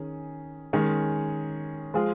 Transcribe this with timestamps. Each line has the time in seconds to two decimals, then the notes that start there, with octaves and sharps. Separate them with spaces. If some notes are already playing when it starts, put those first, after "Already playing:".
Already playing: D#3 C#4 G#4
0.73 D#3 G#3 C#4 G#4 C#5
1.94 F3 G#3 F4 G#4